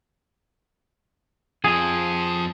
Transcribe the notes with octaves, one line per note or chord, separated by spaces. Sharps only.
F2 F3 G#4